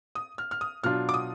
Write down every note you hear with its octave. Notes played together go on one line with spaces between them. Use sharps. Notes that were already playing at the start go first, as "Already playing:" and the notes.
D#6
F6
F6
D#6
B2 F#3 D4 F4 F6
D6
D#6